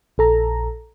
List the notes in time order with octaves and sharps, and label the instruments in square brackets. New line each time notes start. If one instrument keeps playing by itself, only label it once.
[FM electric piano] A#1 A4 A#5